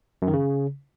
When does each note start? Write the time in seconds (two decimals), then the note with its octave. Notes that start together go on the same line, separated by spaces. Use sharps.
0.22 F#2
0.28 D#3
0.33 C#3